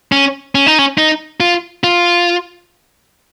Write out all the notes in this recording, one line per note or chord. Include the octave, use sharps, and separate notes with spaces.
C#4
C#4
D#4
C#4
D#4
F4
F4